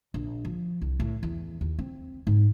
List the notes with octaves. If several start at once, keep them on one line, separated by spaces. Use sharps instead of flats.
A#1
F3
C2
A2
E2
D#2
C4
G#2